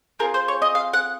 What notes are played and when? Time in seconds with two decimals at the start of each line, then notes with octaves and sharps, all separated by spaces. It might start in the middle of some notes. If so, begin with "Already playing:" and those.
0.19 C4 F4 G#4 A#4
0.34 C5
0.48 C#5
0.62 D#5
0.75 F5
0.94 F#5